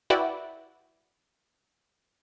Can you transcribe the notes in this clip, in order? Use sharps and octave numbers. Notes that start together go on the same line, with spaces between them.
E4 F#4 B4 D5 G5